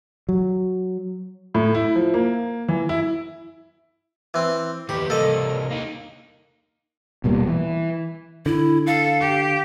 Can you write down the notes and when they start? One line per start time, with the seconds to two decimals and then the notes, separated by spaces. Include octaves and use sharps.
0.29 F#3
1.54 A2
1.75 E4
1.95 F3
2.14 A#3
2.68 E3
2.89 E4
4.34 E3 C4
4.89 D#2 B3 G4
5.10 C2 A#3 A4 D#5
5.70 A#3 D#4
7.24 D#1 B2 G3 A#3
7.47 E3
8.46 D3 E4
8.87 A4 F5
9.20 G4